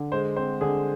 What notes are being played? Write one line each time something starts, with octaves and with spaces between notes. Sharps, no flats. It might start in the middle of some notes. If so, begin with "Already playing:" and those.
Already playing: D3
G#3 C5
C4 C5
D3 G#4